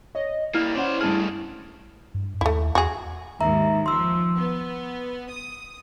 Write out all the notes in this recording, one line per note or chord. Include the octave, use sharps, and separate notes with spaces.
C#5 D#5
G3 A#3 E4 F6
C#4 C5 D5 F#5
G2 A3 G#4 A5 F6
G2
D#2 A3 E4
E2 F#4 G#4
D#2 G#2 E5 A#5
F3 C6 E6
B3
D#6